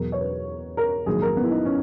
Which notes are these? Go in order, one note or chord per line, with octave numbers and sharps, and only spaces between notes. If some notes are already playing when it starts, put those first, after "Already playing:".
Already playing: E2 B2 F#3 A#4
C#5
B4
A#4
A#1 G#2 D#3 F#3 A#3 G#4
A#4
B3
E4
D#4
C#4